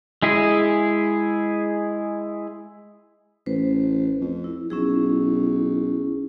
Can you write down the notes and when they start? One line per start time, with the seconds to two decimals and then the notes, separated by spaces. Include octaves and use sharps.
0.22 G#3 E4 G#4
3.46 A1 B4 C5
4.21 F2
4.44 E4
4.70 B1 C#4 E4 G#4